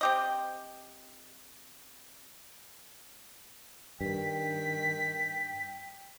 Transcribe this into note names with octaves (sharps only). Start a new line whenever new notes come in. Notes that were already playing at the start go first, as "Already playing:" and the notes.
C4 G4 D#5
G2 D#3 G5 B6